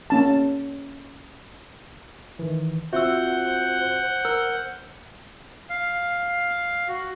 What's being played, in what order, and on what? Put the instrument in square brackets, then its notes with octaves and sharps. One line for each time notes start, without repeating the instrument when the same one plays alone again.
[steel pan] A#3 C#4 A5
[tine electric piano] D#3 E3
[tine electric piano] C4 F4 F#4 [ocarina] C5 [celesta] E5 E6 [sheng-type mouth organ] F#5 G6
[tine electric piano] A#4 [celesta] E6 F6
[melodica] F5
F#4